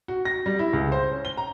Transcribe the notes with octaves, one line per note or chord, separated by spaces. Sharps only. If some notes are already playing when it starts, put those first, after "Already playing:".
F#4
A#6
G3
E4
C#2
C5
C#4
G7
A#5